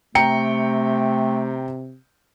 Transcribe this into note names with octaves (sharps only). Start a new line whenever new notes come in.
C3 A3 G5 A#5 C#7